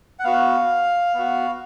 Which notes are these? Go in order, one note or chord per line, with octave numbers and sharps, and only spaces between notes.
F#5
B3 F#4 F5
B3 F#4